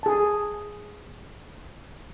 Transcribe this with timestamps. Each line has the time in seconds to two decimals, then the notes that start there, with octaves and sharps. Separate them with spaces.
0.03 G#4 A5